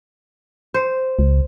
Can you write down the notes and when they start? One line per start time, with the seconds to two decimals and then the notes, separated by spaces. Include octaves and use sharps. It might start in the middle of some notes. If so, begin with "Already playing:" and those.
0.74 C5
1.19 C#2